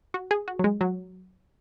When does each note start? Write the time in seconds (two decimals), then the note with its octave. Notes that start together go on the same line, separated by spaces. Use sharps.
0.14 F#4
0.31 G#4
0.48 F#4
0.59 F#3
0.64 G#3
0.81 F#3